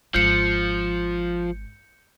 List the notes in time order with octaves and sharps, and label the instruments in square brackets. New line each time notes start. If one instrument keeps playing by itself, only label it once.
[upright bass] G#1 [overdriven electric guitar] F3 [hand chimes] G6 C#7